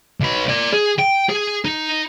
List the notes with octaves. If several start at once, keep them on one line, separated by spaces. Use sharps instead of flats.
B1 B4
A#4 D5
G#4
G5
G#4
D#4